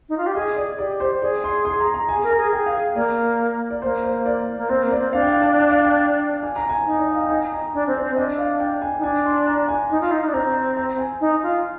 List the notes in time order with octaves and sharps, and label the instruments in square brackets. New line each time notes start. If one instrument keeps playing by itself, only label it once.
[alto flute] D#4
F4
G4
[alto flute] G#4 [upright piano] D#5
[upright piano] D5
[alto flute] G4 [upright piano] D5
[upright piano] C5
[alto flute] G#4 [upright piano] D5
[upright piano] C6
C6
A#5
A#5
[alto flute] G#4 [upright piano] G#5
[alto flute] A#4
[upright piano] A#5
[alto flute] G#4
[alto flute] G#4 [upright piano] G5
[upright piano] F5
[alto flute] A#3 [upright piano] D5
[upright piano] D5
[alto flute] A#3 [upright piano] C5
[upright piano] C5
D5
[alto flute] A#3
[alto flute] C4 [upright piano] C5
[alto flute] A#3
[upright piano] D5
[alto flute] C4
[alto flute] D4 [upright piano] F5
[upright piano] G5
F5
D5
F5
G5
G#5
A#5
G#5
[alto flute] D#4
[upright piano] D5
D#5
F5
G5
G#5
A#5
[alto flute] D4 [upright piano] G#5
[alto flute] C4
[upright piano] D5
[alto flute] C4
[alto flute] D4 [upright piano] D#5
[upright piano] F5
G5
G#5
[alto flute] D#4
[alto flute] D4 [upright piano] G#5
[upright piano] C6
A#5
G#5
[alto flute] D#4
F4
D#4
D#4
D4
[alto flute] C4 [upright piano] A#5
[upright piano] A#5
G#5
[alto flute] D#4
F4